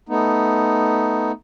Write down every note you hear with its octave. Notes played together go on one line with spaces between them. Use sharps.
A3 B3 D#4